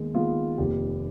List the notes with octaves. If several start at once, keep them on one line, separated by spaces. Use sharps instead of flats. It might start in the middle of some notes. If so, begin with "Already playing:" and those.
Already playing: D#2 D#3 G#3 B3
D#2 D#3 G#3 B3 F4
F1 D#2 D#3 G4